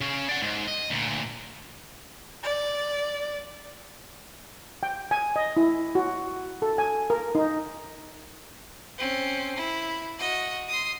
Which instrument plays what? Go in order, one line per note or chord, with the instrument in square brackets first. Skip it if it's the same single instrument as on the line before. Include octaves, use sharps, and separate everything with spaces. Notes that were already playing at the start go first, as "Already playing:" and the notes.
[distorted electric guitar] C#3 C#4
D5 F#5
G#2
D#5
D2 A#2
[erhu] D5
[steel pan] G5
G#5
D#5
E4
F#4
A4
G#5
A#4
D#4
[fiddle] C4 C#4
E4
F#4 D#5
C6 D#6